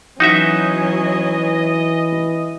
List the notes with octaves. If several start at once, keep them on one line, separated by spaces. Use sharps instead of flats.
E3 F#3 C#4 D#4 F#4 D#5 E5